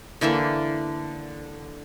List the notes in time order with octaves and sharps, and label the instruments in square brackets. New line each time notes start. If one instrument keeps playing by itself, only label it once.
[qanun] D3 E3 A#3 E5